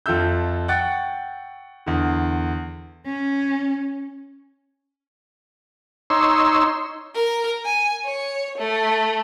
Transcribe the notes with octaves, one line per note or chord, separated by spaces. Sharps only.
F2 F4 A4 E5 E6 G6
F#5 G5 C#6 F#6 A6 C#7
E2 D3
C#4
D#4 C#5 C6 E6
A#4
G#5
C#5
A3